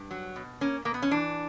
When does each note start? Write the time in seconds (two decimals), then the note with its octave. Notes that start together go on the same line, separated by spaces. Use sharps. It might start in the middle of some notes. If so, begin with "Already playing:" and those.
Already playing: G2
0.11 F#3
0.36 B2
0.61 A#3 C#4
0.85 B2 A#3
0.94 B3
1.02 C#4
1.11 E3 D4